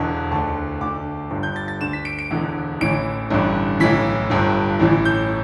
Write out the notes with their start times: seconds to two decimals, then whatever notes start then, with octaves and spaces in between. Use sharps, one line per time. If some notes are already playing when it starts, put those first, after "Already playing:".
Already playing: E1 E2 D3 A5
0.31 D2 D3 A5
0.81 D2 D3 D6
1.31 G1 G2 D3
1.43 G6
1.56 A6
1.68 A6
1.81 D2 D3 E7
1.93 B6
2.05 D7
2.19 D7
2.31 E1 E2 D3
2.81 A1 A2 E3 D7
3.30 A1 G2 D3
3.80 B1 A2 E3 B6
4.30 G1 G2 D3
4.80 A1 A2 E3
5.05 G6